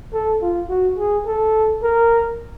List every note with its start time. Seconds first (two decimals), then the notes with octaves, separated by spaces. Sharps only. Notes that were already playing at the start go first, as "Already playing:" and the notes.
0.13 A4
0.42 F4
0.69 F#4
0.98 G#4
1.26 A4
1.83 A#4